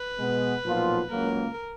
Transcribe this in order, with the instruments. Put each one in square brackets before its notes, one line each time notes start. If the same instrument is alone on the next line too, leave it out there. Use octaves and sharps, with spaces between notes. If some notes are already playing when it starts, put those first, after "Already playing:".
Already playing: [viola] B4
[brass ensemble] B2 G#3 B3
B1 A#2 F3 B3 F4
[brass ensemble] C#2 C#3 F#3 A#3 [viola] A#4